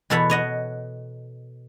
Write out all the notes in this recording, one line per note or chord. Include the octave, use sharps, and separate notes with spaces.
E2 B2 A4 C#5 F#5 B5
C#5 D#5 F#5